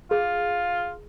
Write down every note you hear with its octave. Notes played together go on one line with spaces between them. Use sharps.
F4 G#4